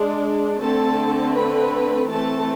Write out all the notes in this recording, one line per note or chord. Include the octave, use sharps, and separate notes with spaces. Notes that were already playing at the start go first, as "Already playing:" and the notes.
Already playing: G#3 D4
D3 A3 C4 A4 A5
B4 B5
E3 A3 C4 A4 A5